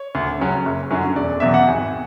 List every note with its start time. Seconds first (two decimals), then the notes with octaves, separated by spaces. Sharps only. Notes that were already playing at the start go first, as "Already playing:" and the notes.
Already playing: C#5
0.15 D2
0.39 C#3 F#3 C#4
0.65 F#1
0.91 F#2 D3 F#3 C#4
1.16 E1 D5
1.40 E2 B2 F#3 E5
1.54 F#5
1.67 G#1 G#5